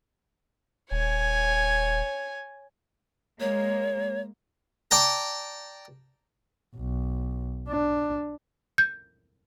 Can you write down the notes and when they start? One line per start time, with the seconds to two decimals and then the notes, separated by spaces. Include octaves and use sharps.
0.91 D#1 C#5 G#5
3.40 G#3 A#3 C#5
4.91 D5 G5 A5 A#5
6.77 B1
7.68 D4
8.78 G6